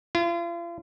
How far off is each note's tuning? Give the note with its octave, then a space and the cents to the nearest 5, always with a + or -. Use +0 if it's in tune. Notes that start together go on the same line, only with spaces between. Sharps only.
F4 -40